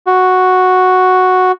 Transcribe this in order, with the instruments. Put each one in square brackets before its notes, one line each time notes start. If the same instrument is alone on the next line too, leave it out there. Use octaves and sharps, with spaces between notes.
[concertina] F#4